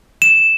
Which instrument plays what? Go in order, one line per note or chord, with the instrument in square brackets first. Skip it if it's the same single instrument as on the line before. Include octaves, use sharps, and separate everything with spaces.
[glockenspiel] E7